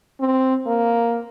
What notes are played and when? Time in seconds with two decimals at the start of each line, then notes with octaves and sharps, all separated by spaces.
0.20 C4
0.66 A#3